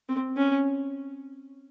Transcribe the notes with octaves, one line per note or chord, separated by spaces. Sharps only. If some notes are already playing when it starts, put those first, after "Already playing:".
C4
C#4